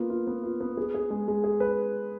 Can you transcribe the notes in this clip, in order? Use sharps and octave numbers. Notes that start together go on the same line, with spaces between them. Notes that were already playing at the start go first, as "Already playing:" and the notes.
Already playing: A#3 B3 F4
F4
B3
F4
B3
G#4
G#4
G#3
G#3
G#4
B4